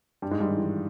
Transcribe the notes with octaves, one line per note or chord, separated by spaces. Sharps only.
G2 G3
G#2 G#3
G2 G3
D#3
E3